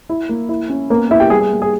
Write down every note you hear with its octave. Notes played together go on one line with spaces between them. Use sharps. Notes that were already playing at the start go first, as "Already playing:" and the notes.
E4
A#3
E4
C#4
A#3 B3 A#4
B3 E4 E5
G4 G5
G3 G#4
G#4
A#3
G#4